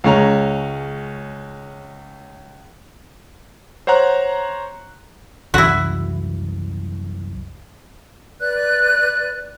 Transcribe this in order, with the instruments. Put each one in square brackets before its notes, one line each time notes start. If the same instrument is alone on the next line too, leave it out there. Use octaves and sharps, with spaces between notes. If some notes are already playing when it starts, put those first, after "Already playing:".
[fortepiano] C#2 G#3 C#4 A#5
[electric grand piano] C5 C#5 F#5 A#5 F#6
[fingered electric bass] C2 F#2 E3 [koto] E4 F#4
[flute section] B4 D5 F#6